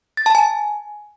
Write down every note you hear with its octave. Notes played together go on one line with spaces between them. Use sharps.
A6
A5
G#5